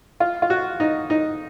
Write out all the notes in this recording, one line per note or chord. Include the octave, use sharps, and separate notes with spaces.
F4
F4
F#4
D#4
D#4